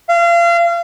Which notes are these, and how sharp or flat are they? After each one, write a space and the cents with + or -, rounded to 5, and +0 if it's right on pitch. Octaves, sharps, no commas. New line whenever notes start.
F5 -30